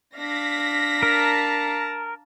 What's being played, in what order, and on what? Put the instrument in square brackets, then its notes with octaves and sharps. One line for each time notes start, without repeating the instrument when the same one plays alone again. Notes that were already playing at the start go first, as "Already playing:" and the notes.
[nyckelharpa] D4 F5 [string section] A#6 B6
[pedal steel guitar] A#4 [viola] A5 A#5